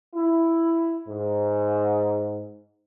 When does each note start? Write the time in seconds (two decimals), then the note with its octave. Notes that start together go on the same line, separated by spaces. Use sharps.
0.15 E4
1.08 G#2